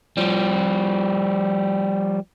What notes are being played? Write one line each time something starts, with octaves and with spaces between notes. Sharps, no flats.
F3 G3